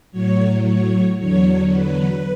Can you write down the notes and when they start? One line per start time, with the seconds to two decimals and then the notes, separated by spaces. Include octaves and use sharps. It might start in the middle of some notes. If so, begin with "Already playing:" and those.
0.12 A2 F#3 C#5
0.66 C#5
1.20 E2 D3 F#3 C#5
1.74 B4